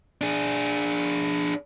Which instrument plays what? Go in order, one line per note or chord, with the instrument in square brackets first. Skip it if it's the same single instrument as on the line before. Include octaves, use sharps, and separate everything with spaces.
[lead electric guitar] D4 G#4